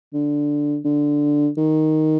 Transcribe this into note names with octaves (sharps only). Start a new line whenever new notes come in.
D3
D3
D#3